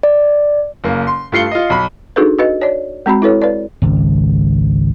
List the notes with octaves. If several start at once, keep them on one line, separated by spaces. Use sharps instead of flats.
D5
F#1 A#3
C6
G2 A3 F4 C7 C#7 G7
F4 D#5
B1 B5
D4 D#4 F#4 G#4 A4 B4
F#4 B4 D#5
C#5 D5
G#3 C4 F#4 B5
E4 A4 B4 C#5
B4 D5
G#1 C#2